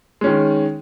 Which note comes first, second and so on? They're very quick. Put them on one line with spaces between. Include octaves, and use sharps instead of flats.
G#3 C#4 D#3